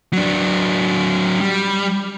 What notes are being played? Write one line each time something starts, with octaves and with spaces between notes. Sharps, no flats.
F#3 D4
G3